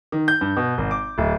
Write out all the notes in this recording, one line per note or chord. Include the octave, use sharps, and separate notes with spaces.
D#3
G6
G2
B2
G#1
D6
D1